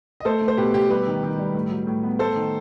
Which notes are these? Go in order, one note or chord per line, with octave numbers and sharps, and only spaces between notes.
D#5
A3 A4 C5
A3
C5
B2 G4 B4
B2 G4
G3 G4 B4
D#3
D#3
G3
A2
F#3
A2
B3
A3 A4 C5
D#3